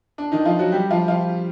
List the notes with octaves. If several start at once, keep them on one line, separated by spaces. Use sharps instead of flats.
D4
D#3 D#4
F3 F4
F#3 F#4
G3 G4
F3 F4
F3 F4